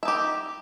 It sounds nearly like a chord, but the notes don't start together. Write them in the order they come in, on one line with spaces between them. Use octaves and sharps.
E5 D#4 G4